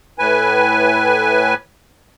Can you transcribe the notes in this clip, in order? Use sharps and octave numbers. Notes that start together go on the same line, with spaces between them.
A2 B4 G#5